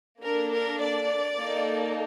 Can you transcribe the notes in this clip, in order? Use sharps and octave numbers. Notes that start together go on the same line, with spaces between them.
A#3 D4 A4 A#4
A#4
D5
A#3 D#4 A4